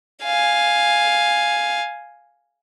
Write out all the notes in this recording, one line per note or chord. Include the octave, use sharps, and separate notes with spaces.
F5 G#5